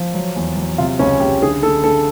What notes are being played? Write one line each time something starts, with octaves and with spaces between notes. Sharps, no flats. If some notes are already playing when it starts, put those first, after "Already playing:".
Already playing: F3
F#3
E2
F#3
C3 F4
C#2 C#4
C#2 G4
D3 G#4
D3 A4
D3 A4